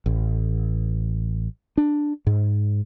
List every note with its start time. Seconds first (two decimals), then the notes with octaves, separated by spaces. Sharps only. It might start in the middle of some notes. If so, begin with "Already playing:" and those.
0.06 A1
1.77 D4
2.27 G#2